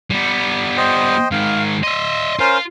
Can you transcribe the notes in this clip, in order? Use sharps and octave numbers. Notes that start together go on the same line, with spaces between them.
G3 B3
C5 D#5 G5
G#2 D#3 F5
D#5 E5 C6
C#4 F4 A#4 C5